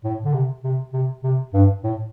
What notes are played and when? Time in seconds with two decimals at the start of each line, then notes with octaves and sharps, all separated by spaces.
0.04 A2
0.25 D3
0.34 C3
0.64 C3
0.93 C3
1.24 C3
1.54 G2
1.84 A2